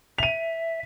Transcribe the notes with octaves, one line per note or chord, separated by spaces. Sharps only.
E5 D#7 F7